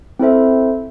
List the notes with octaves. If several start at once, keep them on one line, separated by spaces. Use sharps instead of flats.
C4 E4 A4 C5 E5